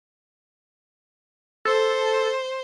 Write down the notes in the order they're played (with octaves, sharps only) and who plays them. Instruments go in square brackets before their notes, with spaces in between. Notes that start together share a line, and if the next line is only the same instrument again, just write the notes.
[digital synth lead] A4 [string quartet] C5